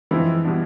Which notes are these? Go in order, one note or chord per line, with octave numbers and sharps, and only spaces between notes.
E3 F3 G#3 C4 E4
B2 G3 B3 D4